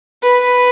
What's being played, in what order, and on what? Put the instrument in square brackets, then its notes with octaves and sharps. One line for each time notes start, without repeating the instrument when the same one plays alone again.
[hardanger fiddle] B4